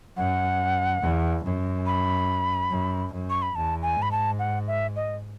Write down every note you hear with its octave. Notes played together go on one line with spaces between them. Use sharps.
F#2 F#5
E2
F#2
B5
F#2
F#2
C#6
B5
E2 A5
G#5
G#2
B5
A5
F#5
E5
D#5